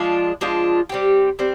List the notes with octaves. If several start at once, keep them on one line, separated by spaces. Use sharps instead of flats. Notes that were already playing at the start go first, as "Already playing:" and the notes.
Already playing: F3 G#3 D4 F4
F3 G#3 D4 F4
G3 C4 G4
G3 C4